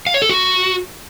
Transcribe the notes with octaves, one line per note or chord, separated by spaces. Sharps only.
F5
C#5
A4
F#4